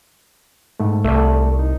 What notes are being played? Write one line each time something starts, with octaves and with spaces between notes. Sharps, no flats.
G#2 A3
C2 A3 D5
D#4